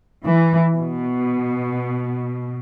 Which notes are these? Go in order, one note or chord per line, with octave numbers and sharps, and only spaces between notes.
E3
B2